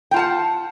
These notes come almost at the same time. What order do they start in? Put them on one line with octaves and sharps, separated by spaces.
G5 F4 A5 F#5